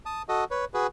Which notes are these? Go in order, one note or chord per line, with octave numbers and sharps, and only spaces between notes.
A5 D#6
F#4 A4 D#5
B4 C#5
F#4 G#4 B4